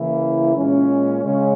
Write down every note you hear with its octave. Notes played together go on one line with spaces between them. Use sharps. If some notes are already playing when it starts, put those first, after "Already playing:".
Already playing: C#3 E3 A#3 E4
A#2 G#3 C#4
C#3 G#3 C#4